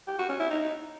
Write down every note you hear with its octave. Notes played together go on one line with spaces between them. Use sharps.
G4
F#4
C#4
E4
D#4